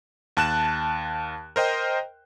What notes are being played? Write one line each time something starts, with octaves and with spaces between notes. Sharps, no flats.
D#2 A5 F#6 E7
A#4 C5 D#5 G5